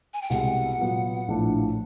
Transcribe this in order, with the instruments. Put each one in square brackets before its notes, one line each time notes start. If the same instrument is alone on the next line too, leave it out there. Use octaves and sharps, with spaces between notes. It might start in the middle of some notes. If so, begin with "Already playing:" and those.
[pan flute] G#5
G5
[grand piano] C2 B2 G#3 [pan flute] F#5
[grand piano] A#2 F#3 B3
A#1 A2 F3 A3 D4